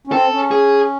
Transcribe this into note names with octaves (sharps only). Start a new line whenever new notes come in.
C#4
C4 A4
C#4
G#4